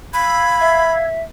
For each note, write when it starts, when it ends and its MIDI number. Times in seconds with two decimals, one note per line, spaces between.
0.14 1.06 77
0.14 0.94 83
0.14 1.06 88
0.14 1.06 92
0.60 1.23 76